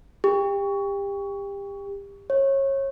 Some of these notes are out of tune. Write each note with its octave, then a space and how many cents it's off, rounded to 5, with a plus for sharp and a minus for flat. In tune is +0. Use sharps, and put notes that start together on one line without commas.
G4 +25
C#5 -25